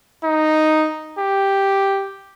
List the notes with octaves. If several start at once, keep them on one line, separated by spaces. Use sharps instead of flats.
D#4
G4